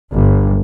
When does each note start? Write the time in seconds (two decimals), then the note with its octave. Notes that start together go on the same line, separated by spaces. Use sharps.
0.13 G1